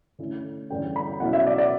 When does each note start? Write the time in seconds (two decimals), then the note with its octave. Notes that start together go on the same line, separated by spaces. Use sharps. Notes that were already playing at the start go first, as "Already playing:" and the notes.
0.19 D3 A3 C#4 E4
0.70 E2 D3 G3 C#4 G5
0.96 B5
1.20 B2 F#3 C#4 E4 F#5
1.33 E5
1.46 D5
1.58 D5